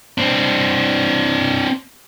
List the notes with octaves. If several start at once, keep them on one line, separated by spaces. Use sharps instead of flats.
C4 D4